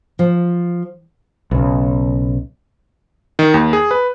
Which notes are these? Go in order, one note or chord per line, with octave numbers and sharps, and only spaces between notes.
F3
B1 C#3
D#3
D#2
G#4
B4